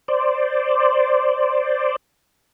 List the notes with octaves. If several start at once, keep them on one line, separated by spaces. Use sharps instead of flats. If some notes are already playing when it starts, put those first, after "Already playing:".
C5 D5